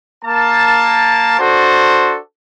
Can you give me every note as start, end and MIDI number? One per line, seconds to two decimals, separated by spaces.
0.25 1.36 58
0.25 1.36 81
1.39 2.16 62
1.39 2.16 66
1.39 2.16 69
1.39 2.16 72